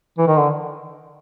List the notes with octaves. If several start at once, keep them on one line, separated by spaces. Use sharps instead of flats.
E3
D#3
D3